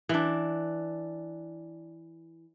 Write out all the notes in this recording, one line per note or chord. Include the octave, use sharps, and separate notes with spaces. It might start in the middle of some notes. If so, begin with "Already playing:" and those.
E3 D4